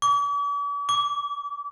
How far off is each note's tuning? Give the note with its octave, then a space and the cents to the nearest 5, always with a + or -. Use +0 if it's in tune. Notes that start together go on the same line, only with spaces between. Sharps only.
D6 -45
D6 -25